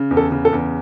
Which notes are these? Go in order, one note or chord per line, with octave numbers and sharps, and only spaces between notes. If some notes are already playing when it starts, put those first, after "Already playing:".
Already playing: C#3
E2
A4
C#3
A4
E2